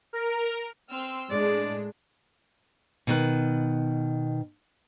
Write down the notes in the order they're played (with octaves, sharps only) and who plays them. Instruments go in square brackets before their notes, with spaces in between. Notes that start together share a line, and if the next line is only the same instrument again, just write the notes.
[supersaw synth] A#4
[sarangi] C4 [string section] C6 E6 F6
[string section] A2 G#3 D4 [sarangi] D5
[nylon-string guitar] B2 D#3 B4